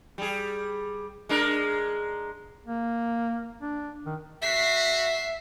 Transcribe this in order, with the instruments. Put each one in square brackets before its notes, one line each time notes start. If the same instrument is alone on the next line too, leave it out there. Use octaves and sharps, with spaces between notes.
[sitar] G3 G#4
G#3 D4 A#4
[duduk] A#3
D4
D#3
[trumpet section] F#4 [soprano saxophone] E5 [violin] B6 C7